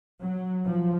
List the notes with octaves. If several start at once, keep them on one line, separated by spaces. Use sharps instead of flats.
F#3
F3